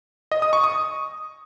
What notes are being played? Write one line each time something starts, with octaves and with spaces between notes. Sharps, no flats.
D#5
D#6
C#6
D#6